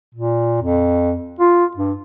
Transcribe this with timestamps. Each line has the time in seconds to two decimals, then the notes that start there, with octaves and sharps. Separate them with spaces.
0.15 A#2
0.62 F2
1.40 F4
1.77 G2